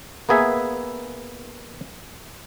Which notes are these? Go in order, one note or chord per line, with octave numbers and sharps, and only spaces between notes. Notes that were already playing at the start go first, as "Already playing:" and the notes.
A#3 B3 G#4 E5 G#5